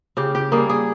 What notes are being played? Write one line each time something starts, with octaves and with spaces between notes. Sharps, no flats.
C#3 G4
G4
G3 A#3 G#4
G#4